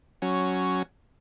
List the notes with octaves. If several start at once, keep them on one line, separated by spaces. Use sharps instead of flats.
F#3 C#4